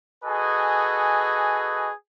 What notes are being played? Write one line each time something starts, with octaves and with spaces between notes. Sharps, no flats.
F#4 G#4 A4 B4 D#5 G#5